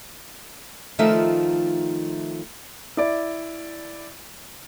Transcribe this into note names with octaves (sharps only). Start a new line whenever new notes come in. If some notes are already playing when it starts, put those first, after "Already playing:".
D#3 F3 A3 D#4 F4 E5
E4 D5